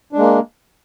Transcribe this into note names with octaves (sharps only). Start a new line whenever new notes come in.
G#3 A#3 D4